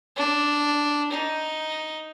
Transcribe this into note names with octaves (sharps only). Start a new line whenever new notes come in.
D4
D#4